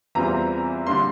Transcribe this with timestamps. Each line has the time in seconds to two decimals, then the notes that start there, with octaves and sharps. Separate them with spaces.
0.15 E2 E3 G3 C4 F4 A#5
0.87 D3 G3 A#3 C6